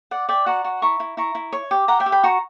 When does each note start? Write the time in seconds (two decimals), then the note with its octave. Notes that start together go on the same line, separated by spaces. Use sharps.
0.11 D5 F#5
0.29 D5 E5 G5
0.46 F#4 F#5 A#5
0.64 F#4
0.82 E4 A#5 C#6
1.00 E4
1.17 E4 A#5 C#6
1.35 E4
1.52 C#5
1.71 G4
1.88 G4 F#5 A#5
2.00 E5 G5
2.06 G4
2.12 G5 B5
2.23 F#4 A#5 C#6